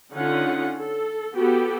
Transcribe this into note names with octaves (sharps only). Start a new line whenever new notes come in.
D3 C#4 D#4 F4 F#5
A4
B3 F#4 G4 A4